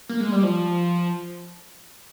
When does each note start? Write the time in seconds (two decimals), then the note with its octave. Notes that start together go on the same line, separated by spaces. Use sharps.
0.09 A#3
0.20 G#3
0.32 G3
0.43 F3